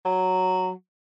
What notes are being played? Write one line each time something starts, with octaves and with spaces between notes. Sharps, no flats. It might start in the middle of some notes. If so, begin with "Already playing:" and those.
F#3